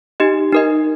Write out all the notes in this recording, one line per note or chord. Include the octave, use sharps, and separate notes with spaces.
D#4 G4 D#5
D#4 A#4 D#5